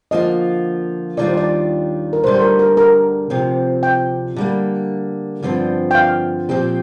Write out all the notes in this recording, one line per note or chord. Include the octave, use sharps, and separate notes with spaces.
D3 F3 A#3 F4 D#5
D#2 D#3 G3 D4 F4 D5
C5
D5
A#4
D2 D3 G3 C5
C5
A#4
A#4
A#4
D2 C3 F3 C4
G5
D3 G3 A#3
G2 D3 F3 C4
G5
F5
A#2 F3 C4 G4